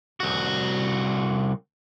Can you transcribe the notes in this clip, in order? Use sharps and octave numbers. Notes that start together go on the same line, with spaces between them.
C2 F#4